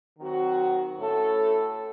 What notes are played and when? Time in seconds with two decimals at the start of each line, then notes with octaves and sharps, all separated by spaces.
0.19 D#3 F#3 C4 F#4
0.99 A2 A3 C#4 A4